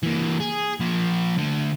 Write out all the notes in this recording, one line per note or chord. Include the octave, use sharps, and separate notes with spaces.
E3 A#3
G#4
F3 A#3
D3 A3